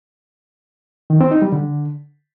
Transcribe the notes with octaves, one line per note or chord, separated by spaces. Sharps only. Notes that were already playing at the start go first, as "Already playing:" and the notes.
D#3
C4
D#4
G3
D3